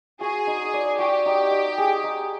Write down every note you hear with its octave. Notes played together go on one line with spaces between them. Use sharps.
F#4 G#4
D#4
D5
F#4 G4
D#4
D#5
G#4
D#4